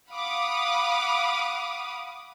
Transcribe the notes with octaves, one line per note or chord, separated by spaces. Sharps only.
F5 F#5 B5 D6 D#6